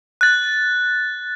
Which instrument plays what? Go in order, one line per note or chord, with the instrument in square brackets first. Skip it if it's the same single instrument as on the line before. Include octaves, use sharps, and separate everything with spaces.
[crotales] F#6 A6